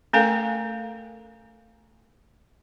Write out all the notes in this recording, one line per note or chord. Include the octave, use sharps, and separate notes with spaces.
A3 C#4 A4 A#4 F5 G#5